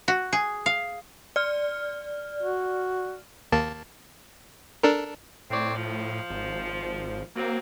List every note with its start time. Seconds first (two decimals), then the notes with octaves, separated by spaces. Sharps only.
0.08 F#4
0.33 G#4
0.66 F5
1.36 D5 F6
2.43 F#4
3.52 D#2 A#3 A5
4.83 D4 A4 A#4
5.50 A2 C4 C#5 D5
5.75 F3
6.30 G#1
7.36 F#3 A#3 C4